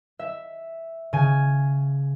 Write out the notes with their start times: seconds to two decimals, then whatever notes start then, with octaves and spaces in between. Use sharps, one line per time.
0.19 E5
1.13 C#3 G#5